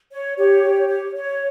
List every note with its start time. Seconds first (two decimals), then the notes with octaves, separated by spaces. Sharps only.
0.11 C#5
0.37 G4 C#5
0.63 G4
0.88 C#5
1.14 C#5